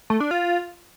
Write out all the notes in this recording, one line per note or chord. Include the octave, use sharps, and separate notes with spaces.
A3
D4
F4